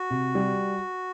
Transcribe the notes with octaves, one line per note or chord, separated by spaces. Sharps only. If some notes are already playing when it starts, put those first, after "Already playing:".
Already playing: F#4
C3
G3